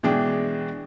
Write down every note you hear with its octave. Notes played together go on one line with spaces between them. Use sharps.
B2 E3 G#3 D4 G#4 G5